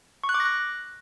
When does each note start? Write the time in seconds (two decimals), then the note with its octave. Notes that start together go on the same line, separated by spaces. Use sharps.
0.24 C#6
0.29 F#6
0.34 D6
0.40 A#6
0.45 F#6